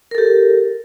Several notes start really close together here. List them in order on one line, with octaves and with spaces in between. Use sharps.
A#4 A4 G4